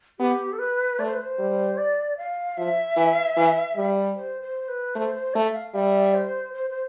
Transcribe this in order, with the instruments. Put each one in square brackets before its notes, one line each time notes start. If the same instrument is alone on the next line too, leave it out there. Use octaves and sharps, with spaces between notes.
[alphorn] B3 [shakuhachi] G4
[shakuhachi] A4
B4
[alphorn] A3 [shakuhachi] D5
[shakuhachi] C5
B4
C5
[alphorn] G3
[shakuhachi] D5
F5
[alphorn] F3 [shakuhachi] E5
[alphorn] E3
E3
G3
[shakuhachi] C5
C5
B4
[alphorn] A3 [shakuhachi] C5
[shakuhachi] C5
[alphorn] A3 [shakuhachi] E5
[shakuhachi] F5
[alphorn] G3 [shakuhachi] E5
[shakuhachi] C5
C5
C5